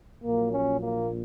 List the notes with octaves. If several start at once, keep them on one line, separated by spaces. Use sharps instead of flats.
A#1 A#2 F#3 A#3
C#4
A#3